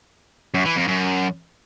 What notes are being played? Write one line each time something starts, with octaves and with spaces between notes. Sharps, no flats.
F#2
E3
F2
F#2